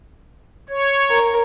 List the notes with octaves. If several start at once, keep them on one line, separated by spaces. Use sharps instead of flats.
C#5
A#4